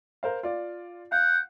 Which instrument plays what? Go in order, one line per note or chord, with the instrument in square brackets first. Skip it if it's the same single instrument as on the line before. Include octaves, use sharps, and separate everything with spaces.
[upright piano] A#4 C5 F5
F4 D5
[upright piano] F5 [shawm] F#5 [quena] G6